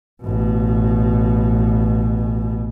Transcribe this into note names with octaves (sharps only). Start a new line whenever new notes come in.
A1 B2